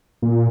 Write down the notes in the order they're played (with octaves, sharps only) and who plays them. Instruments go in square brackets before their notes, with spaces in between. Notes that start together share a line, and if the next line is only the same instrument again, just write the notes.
[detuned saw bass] A#2